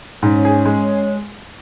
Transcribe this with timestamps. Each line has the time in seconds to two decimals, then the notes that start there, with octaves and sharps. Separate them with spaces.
0.22 G#2 C#4
0.45 G#4
0.65 G#3